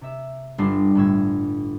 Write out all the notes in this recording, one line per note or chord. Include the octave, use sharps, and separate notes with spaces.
C3 E5 E6
G1 G3 D4 C7
G1 A2 E6 G#6